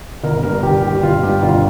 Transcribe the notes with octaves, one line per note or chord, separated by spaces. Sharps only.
G1 A#4
G2 A#4
G1 G4
D#3 G4
G1 F4
G2 G4
G1 F4